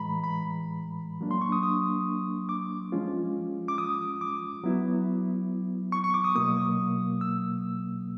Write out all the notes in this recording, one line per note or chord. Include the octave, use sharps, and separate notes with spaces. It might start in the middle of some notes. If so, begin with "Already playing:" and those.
Already playing: A2 E3 G#3 A#5 B5
B5
F#3 A#3 D4
C6
C#6
D#6
D#6
D6
F3 G#3 C#4 F4
D6
D#6
D6
F#3 B3 E4
C#6
C#6
D6
D#6
B2 F#3 A#3 D#6
E6